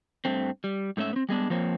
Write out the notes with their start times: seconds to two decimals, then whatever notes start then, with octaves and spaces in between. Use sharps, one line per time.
0.25 G2 A3 C4
0.64 G3
0.97 G#2 A3 C#4 E5
1.13 B3 C4
1.29 G3 G#3 B3 D4
1.50 F3 A#3 C4 C#5